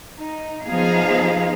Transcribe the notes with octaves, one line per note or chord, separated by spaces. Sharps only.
D#4
F3 B3 D#4 G#4 F5